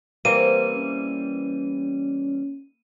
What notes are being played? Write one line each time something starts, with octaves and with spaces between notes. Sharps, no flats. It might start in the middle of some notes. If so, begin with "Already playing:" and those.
E3 G3 A#3 C4 D#7
C#4